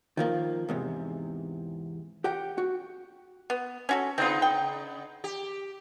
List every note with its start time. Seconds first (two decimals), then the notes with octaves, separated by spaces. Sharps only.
0.17 D#3 F3 A#3
0.69 E2 G#2 C3
2.24 G4 F#5 G5
2.58 F#4
3.50 B3
3.89 C#4 F#4 A4
4.18 C#3 B3 C4 D#4 F4
4.42 G5
5.24 G4